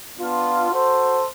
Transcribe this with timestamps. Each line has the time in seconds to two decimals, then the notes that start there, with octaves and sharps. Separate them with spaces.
0.17 B3 D4 F4
0.70 F#4 A4 C5